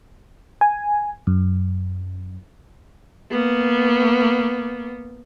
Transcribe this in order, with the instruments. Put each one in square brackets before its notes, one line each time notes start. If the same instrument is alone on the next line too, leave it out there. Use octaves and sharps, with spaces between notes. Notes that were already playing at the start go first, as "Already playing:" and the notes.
[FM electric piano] G#5
F#2
[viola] A#3 B3